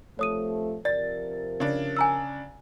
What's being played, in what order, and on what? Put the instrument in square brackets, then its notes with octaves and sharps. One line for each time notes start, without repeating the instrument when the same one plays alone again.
[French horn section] C3 F3 A3 [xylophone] C#5 D#6 D#7
[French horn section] C3 F3 A#4 [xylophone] D5 [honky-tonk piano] A6
[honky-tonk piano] C#3 D4
[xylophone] G#5 A#5 E6